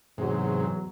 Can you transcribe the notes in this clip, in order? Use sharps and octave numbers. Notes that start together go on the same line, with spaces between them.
E2 G#2 C3 F#3